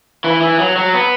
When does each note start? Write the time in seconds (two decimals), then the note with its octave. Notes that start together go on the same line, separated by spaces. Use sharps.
0.24 E3
0.42 E3
0.59 F#3
0.76 F#3
0.94 B3